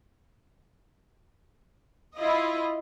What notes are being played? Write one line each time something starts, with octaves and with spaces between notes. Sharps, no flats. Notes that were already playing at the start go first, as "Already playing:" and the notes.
E4 F4 D#5